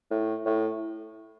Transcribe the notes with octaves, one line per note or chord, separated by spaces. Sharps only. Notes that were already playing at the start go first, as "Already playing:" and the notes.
A2
A2